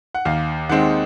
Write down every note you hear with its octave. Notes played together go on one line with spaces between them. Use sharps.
F#5
D#2 F5
D#3 G#3 C4 F#5